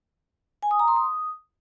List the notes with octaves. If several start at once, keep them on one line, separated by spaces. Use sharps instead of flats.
G#5
D#6
A#5
C6
D#6